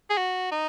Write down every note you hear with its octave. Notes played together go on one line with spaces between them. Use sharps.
G#4
F#4
D#4